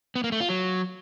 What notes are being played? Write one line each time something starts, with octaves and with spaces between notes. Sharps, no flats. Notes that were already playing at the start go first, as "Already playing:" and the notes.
B3
A#3
A3
F4
F#3